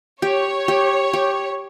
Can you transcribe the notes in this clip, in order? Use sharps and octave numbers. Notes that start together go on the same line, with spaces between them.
G4 C#5
G4
G4